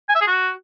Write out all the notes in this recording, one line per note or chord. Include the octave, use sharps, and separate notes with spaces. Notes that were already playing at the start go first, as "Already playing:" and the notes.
G#5
E5
G#4
F#4